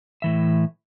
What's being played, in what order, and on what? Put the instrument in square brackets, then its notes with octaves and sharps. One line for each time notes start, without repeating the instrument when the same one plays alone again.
[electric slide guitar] A2 E3 E5